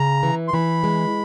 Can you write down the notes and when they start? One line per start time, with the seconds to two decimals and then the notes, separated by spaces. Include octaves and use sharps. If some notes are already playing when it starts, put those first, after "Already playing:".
Already playing: C#3 A#5
0.23 E3
0.48 C6
0.53 E3 B5
0.84 G#3